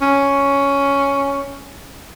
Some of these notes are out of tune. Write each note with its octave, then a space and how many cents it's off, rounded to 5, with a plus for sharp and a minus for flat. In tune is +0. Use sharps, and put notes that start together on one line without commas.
C#4 +5